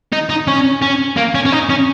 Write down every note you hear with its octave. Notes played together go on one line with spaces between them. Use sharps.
D#4
D#4
C#4
C#4
A#3
C#4
C#4
D#4
C#4